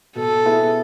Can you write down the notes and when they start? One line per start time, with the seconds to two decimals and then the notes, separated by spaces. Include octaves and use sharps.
0.15 B2 A4
0.45 B3 E4 G#4